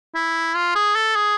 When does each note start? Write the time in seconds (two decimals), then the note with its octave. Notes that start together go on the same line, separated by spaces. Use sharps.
0.15 E4
0.56 F4
0.75 G#4
0.95 A4
1.16 G#4